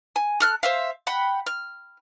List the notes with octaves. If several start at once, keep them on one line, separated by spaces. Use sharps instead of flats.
G#5
A4 F6 F#6
C5 E5 F5
F#5 G5 B5
F6